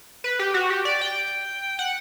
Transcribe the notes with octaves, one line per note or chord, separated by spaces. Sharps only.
B4
G4
F#4
G4
D5
G5
F#5